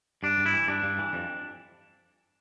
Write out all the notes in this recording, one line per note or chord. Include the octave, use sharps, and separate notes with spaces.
G2 D4
G2
E4
E3
G2 D4
G2
E3
F2